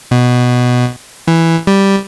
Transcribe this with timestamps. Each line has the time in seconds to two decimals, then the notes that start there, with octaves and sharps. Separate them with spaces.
0.11 B2
1.28 E3
1.67 G3